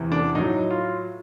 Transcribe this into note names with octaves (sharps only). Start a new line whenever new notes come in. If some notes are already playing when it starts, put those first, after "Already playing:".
Already playing: E2 C3 E3
D4
A2 F#3 D#4
F4